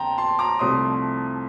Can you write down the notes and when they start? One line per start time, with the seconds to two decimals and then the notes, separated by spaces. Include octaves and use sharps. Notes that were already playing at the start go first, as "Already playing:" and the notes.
Already playing: F2 D3 G5 A5 A#5 C6
0.18 A5 C6
0.39 A#5 D6
0.59 C2 C3 F3 A3 C6 D#6